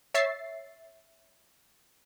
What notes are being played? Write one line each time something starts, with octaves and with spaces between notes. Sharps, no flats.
C#5 E5 A6 C7